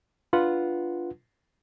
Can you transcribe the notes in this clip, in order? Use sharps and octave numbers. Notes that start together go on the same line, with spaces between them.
D4 F4 B4 F#5